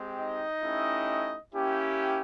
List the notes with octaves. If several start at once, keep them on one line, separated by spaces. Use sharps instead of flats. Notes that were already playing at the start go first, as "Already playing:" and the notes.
Already playing: G#3 C4 G4
D#4 D#5
A3 C#4 E4 G4
A#3 C#4 E4 G4